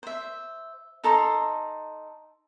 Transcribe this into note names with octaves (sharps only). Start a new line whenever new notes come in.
C5 E5
D#4 A4 A#5 C6